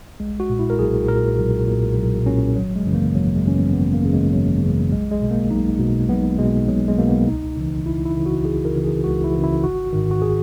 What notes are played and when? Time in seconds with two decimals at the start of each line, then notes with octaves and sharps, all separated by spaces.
0.20 B1 G#3
0.40 F#4
0.50 A#2
0.59 E4
0.70 A#4
0.79 B1 G#4
1.08 A#2 A#4
1.38 B1
1.67 A#2
1.97 B1
2.26 A#2 C#4
2.55 G#1 F#3
2.76 G#3
2.86 F#2 C#3 E3
2.95 A#3
3.15 G#1 F#3
3.35 G#3
3.45 F#2 C#3 E3 C#4
3.55 B3
3.73 G#1 B3
3.94 A#3
4.04 F#2 C#3 E3
4.13 G#3
4.33 G#1 F#3
4.62 F#2 C#3 E3
4.91 B1 G#3
5.12 G#3
5.21 B2
5.31 A#3
5.50 B1 D#4
5.79 B2
6.09 B1 B3
6.39 B2 G#3
6.68 B1 F#3
6.88 G#3
6.98 B2 A#3
7.07 B3
7.27 C#2 D#4
7.57 C#3 E3
7.86 C#2 E4
8.05 E4
8.16 C#3 E3
8.26 F#4
8.45 C#2 G#4
8.65 A#4
8.75 C#3 E3
8.84 G#4
9.04 C#2 F#4
9.24 E4
9.34 C#3 E3
9.43 E4
9.63 G#1 F#4
9.92 G#2 D#3
10.11 F#4
10.22 G#4